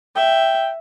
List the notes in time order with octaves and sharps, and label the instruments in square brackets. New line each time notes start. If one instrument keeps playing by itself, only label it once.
[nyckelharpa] E5 [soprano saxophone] G5